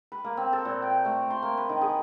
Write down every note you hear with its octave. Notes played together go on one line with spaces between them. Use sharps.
B4
A#3
C4
A4
A#2
G5
A3
C6
A#3
B4
D#3
G#4